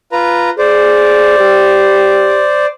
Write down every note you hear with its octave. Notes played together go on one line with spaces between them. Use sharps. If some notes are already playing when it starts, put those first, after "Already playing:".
F4 B4 A#5
G#4 C5 D5
G4